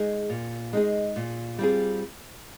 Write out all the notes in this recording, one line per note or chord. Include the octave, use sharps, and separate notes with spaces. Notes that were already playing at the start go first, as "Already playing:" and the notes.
Already playing: G#3 D#4 G#4
A#2
G#3 D#4 G#4
A#2
G3 C4 F4 G#4